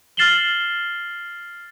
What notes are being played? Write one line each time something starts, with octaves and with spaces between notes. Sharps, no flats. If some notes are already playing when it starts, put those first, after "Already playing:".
F6 A6 C7 E7 F#7 G7